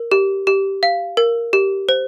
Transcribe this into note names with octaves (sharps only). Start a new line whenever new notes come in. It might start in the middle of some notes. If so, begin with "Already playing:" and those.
Already playing: A#4
G4
G4
F5
A#4
G4
C5